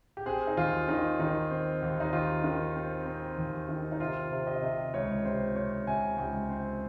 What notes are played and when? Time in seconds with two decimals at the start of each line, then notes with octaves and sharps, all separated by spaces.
0.17 G4
0.26 C4 G#4
0.47 D#4
0.57 D#2 F4
0.88 D#3 D#4
1.19 D#3 D#4
1.51 C4
1.82 D#2
2.00 D#4
2.13 D#2 F4
2.44 D#3
2.76 C4
3.06 C4
3.38 D#2
3.69 D#3
3.92 D#4
4.00 C3 F4
4.31 C3
4.47 D#5
4.62 C3
4.94 C#2 C#5
5.25 C3 C5
5.56 C4 C#5
5.87 C3 G#5
6.18 C#2 G5
6.50 C4